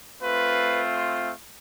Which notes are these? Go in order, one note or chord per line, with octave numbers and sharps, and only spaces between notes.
A3 C4 F4 B4